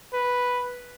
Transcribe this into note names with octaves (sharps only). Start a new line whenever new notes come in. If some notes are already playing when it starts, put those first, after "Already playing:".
B4